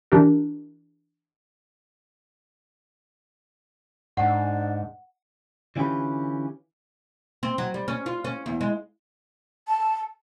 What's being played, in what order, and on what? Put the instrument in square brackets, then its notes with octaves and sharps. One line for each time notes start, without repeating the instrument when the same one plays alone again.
[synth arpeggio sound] E3 D4 G4 A#4
[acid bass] G#2 [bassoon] D4 [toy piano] F#5
[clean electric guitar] D3 E3 C#4 F4 G4 B4
[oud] C4
F#3
G3
C#4
F4
C#4
E2
G#3
[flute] A5